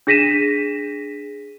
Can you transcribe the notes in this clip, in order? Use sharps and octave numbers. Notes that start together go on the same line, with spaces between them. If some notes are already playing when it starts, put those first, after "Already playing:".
D4 G#4 A#6 B6 D#7 E7